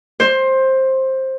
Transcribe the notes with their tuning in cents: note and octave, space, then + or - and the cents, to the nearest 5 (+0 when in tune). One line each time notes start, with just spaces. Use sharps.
C5 +15